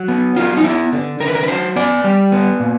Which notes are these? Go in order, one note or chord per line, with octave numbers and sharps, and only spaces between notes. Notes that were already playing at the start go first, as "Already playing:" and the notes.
Already playing: F#3
B3
F#3 F4
D#4
B3 E4
D3
D3 A#4
B4
A#4
B4
F#3 C5
B3 D5
G3
B3
A#2